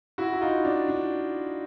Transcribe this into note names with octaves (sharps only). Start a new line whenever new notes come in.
E4 F#4
E4
D#4 F4
D4
D4